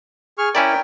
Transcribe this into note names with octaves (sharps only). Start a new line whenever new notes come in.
G#4 C#6 F6
C#4 E4 A#4 D5 G5